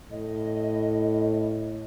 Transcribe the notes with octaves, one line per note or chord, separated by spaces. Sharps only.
A2 D#5